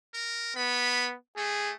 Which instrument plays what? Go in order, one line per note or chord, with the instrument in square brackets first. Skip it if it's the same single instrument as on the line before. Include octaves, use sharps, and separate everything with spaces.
[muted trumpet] A#4
[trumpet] B3 [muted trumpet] B5
[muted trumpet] A3 [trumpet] G#4